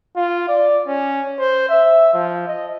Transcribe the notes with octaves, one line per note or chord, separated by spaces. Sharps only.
F4
D5
C#4
C5
E5
F3
D#5